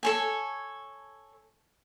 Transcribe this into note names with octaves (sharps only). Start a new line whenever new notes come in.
A4 C#5 G#5